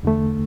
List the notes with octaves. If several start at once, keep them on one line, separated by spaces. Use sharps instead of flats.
E2 D3 A3